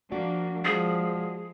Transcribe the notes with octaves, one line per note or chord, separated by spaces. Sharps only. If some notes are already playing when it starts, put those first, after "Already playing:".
F3 A#3 D4 F#4 D5
F3 G#3 G#4